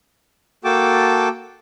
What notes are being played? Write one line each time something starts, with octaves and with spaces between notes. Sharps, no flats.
A#3 F#4 A4 G5 A5 D6